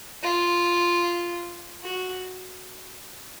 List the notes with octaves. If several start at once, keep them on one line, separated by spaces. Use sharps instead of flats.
F4
F#4